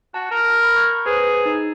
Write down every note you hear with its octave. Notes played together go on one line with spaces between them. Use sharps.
F#4 A5
A#4
B5
C#6 G6 G#6
G#4 B4 C5
D#4